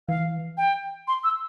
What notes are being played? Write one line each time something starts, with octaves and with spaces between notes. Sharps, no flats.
E3 F5
G5
C6
E6